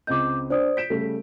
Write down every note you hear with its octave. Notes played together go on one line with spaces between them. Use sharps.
C#2 C4 D#5 D6 G6
D4 C5 D5 D#6
G6 B6 D7 E7
C#3 G3 A3